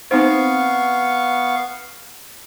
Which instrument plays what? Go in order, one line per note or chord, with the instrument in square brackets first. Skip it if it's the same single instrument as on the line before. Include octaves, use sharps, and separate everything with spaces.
[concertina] B3 F5 C#6 [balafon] C4 D#4 C5